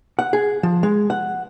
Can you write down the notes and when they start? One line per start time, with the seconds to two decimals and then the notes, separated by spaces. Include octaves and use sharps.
0.19 F#5
0.33 G#4
0.63 F3
0.83 G#3
1.10 F#5